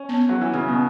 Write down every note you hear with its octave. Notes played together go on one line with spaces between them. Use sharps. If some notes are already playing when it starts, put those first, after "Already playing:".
Already playing: C#4
B3
F#3 G#4
E3
C#3 E4
B2